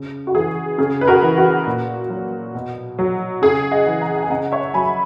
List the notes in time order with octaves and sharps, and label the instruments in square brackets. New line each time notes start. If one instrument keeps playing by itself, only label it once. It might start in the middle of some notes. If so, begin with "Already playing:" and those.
Already playing: [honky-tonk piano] C#3
F#4
E3 G#4
C#3 G#4
B4
F#4 A#4
E3
F#4
A#2
F#3
B2
F#3
C#3 G#4
D#5 F#5
E3
F#5 A#5
F#5
G#5
C#3 F#5 A#5
C#5 E5
F#3 G#5 B5